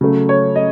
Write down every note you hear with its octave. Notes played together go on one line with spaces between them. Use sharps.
C#3 F#3 A3
C#5
D#5